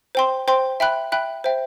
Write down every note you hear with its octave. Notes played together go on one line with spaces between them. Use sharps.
C5 G5 C6
C5 G5 C6
E5 G5 B5 F#6
E5 G5 B5 F#6
C5 E5 G5